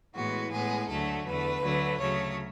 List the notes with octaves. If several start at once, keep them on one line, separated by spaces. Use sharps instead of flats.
A2 E3 G#3 B3 F#4
A2 G#3 B3 G#4
D2 D3 F#3 A3 A4
E2 D3 A3 B4
D2 D3 F#3 A3
D2 C#3 F#3 A3 C#5